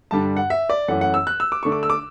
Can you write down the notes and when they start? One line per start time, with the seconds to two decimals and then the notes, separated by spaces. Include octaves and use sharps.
0.11 G2 D3 G3 D4 A5
0.37 F#5
0.50 E5
0.70 D5
0.88 F#2 E3 A3 C#4 F#5
1.01 F#5
1.14 E6
1.27 F#6
1.40 E6
1.52 D6
1.63 D3 A3 D4 C#6
1.72 D6
1.83 E6
1.90 D6